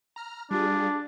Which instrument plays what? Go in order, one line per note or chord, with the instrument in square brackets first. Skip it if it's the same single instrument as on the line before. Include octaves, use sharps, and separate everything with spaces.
[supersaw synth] A#5 F6
[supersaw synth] G3 F4 G#4 [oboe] D4